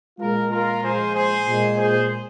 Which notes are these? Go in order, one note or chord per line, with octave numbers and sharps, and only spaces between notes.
A#2 G#3 F4 A#4
F4 A#4
A#2 F3 G#3 G#4 C5
G#4 C5
A#2 G#3
G#4 C5